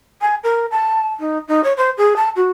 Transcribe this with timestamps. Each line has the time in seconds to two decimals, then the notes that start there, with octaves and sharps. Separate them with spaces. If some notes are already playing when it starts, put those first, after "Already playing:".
0.21 G#5
0.44 A#4
0.71 A5
1.20 D#4
1.48 D#4
1.64 C#5
1.77 C5
1.97 G#4
2.16 A5
2.36 F#4